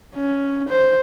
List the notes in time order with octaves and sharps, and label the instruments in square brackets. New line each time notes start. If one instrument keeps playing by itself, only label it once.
[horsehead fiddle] C#4
C5